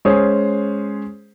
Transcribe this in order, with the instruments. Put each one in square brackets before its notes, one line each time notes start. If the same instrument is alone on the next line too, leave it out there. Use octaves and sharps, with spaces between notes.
[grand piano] G#3 C#4 G#4 C5